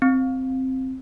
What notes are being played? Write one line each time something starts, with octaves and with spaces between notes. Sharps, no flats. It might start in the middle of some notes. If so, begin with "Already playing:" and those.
C4